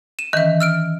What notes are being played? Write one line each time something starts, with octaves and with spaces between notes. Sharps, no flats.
D#7 E7
D#3 E3 C#4 D#5 E5
E6 F6 D7